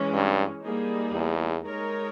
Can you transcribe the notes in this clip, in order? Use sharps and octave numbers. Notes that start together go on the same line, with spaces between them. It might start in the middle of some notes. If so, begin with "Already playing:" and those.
Already playing: E3 G#3 C#4
G2
G3 A#3 D#4 G#4
E2
G#3 D#4 A#4 C#5